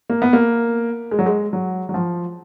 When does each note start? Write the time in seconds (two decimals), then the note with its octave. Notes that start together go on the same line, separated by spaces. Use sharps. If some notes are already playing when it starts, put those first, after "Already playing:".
0.10 A#3
0.22 B3
0.33 A#3
1.11 G#3
1.19 F#3
1.26 G#3
1.53 F#3
1.89 F#3
1.94 F3